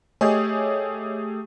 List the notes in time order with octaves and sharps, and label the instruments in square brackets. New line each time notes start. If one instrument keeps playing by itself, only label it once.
[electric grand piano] A3 G4 G#4 [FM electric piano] C#5 D#5 G#5